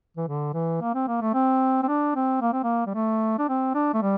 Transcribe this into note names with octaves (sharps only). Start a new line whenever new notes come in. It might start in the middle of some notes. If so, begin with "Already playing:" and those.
E3
D3
E3
A#3
C4
A#3
A3
C4
C4
D4
C4
A#3
C4
A#3
G3
A3
D4
C4
D4
A3
G3